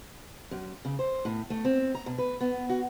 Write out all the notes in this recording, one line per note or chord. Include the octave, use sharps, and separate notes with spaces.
F#2
C#3
C5
A2
A3
C4
A#5
B2
B4
B3
F#4